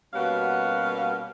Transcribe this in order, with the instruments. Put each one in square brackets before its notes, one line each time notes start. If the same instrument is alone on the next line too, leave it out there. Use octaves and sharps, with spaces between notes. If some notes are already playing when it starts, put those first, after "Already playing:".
[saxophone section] B2 G3 A#3 C#4 F#4 F5